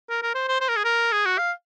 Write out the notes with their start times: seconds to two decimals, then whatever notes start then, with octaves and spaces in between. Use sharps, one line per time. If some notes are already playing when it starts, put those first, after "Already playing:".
0.10 A#4
0.23 A#4
0.35 C5
0.48 C5
0.61 C5
0.69 A#4
0.77 G#4
0.84 A#4
1.12 G#4
1.26 F#4
1.38 F5